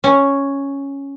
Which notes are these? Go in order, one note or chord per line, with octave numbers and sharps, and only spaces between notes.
C#4